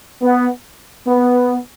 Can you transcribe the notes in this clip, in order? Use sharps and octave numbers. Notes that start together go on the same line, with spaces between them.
B3
B3